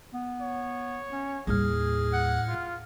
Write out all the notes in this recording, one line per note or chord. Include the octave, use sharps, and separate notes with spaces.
B3
C#5
C#4
D#2 A2 G3 G#4 F6
F#5
F4